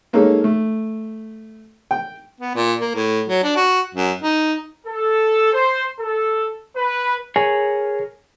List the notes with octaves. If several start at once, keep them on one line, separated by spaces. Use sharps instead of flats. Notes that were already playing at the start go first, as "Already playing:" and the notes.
G#3 A#3 C#4 D#4 A4 A#4
A3
G5
B3
A#2
A#3
A2
F#3
D4
F#4
F#2
D#4
A4
C5
A4
B4
G#4 A#4 C#5 G#5